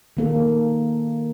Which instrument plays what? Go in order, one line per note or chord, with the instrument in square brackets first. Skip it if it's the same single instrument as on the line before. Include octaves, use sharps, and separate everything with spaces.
[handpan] D#3 A#3 A4